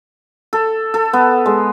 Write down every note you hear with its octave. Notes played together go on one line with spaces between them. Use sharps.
A4
A4
B3
G#3